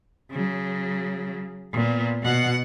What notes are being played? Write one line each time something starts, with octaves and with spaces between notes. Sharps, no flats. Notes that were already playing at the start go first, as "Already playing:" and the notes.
C#3 F#3
A#2 B3
B2 F#5